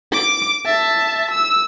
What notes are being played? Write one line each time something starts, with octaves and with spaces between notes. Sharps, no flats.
D6
E5 A5
E6